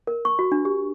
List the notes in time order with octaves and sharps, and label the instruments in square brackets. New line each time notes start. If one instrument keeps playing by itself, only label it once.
[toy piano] A#4
C#6
F#4
D4
G4